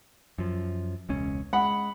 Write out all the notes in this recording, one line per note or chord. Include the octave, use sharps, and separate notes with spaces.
F#2 F3
E1 C#2 C#4
G#3 F#5 B5